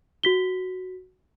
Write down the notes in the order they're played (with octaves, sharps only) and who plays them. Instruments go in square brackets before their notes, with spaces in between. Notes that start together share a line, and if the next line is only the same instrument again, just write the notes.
[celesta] F#4 B6 G7